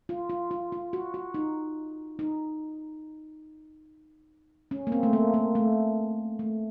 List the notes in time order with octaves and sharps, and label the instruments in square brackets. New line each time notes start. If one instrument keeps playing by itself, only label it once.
[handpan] F4
F4
F4
F4
F#4
F#4
D#4
D#4
C#4
A#3
C4
A3
A#3
A#3
A3
A3